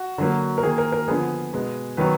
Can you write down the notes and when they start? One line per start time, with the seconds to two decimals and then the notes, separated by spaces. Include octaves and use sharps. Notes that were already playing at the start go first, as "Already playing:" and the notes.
Already playing: F#4
0.18 D3 F#3 A#3
0.58 A#4
0.63 D#3 A#3 G#4
0.78 A#4
0.92 A#4
1.08 D3 F3 B3 G#4
1.53 B2 G#3 B3
1.97 D#3 F#3 B3 B4